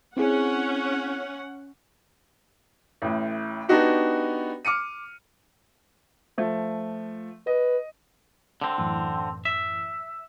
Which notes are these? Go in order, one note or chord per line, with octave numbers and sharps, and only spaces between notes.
C4 C#4 E4 G#4 F#5
A1 A2
B3 D4 D#4 F#4 G4
D6 F6 C#7 D#7
F3 A3
B4 D#5
D3 C4
F#2 A2 E3
E5